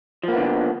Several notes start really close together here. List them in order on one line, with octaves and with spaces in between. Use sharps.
F3 A#3 B3 D3